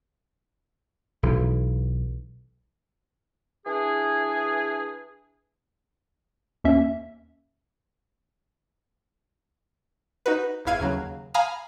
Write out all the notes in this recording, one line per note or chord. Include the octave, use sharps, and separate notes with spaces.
B1 E3
E3 D4 G#4
D#2 A#3 C#4 E5
D#4 F#4 B4
G1 E2 E4 F5 G#6 D#7
D#2 C#3 F#3
F5 G#5 A#5 B5 D#6 F6